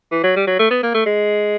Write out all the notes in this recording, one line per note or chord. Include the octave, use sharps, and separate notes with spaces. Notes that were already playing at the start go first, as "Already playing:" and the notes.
E3
F#3
G3
F#3
A3
B3
A#3
A3
G#3